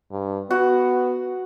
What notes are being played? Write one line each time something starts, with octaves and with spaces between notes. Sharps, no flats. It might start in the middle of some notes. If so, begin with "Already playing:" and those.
G2
B3 F#4